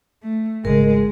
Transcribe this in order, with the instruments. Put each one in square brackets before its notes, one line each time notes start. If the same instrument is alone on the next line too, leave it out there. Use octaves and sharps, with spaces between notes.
[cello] A3
[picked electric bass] G#1 C#3 [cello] G#3 [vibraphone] A#4